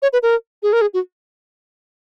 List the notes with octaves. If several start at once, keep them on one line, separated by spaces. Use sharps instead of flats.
C#5
B4
A#4
G#4
A#4
G#4
F#4